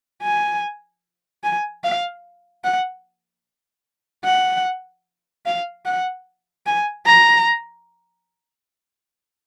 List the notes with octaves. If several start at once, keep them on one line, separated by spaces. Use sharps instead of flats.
G#5
G#5
F5
F#5
F#5
F5
F#5
G#5
A#5